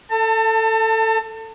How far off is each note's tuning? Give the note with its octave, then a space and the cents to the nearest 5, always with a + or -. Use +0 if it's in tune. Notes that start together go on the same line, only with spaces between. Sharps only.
A4 +10 A5 +35